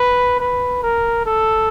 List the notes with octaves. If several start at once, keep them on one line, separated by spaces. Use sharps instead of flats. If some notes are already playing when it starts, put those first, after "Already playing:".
Already playing: B4
B4
A#4
A4